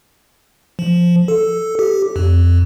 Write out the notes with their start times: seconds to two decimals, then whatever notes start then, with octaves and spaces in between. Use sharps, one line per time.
0.79 F3
1.28 A4
1.79 G4
2.16 F2